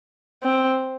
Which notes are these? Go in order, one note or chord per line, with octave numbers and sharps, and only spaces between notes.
C4